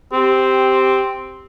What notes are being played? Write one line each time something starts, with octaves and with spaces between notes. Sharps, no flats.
C4 G4